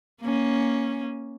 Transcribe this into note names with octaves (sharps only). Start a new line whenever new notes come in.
A#3 C#4